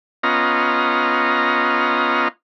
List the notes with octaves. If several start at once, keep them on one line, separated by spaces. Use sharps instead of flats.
B3 C#4 F4 D#5 A#5